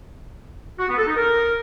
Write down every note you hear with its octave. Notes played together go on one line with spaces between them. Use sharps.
F#4
B3
A4
D#4
A#4